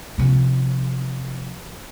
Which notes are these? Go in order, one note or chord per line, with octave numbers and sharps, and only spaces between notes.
C3 F3